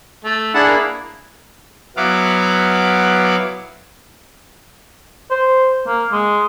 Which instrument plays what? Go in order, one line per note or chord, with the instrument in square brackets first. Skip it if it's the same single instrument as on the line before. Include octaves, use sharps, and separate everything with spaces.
[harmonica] A3
[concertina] D4 E4 G#4 [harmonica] F#5 A5
[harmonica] A#3
[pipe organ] F#3 B3 E4 F5 D6
[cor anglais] C5
A#3
G#3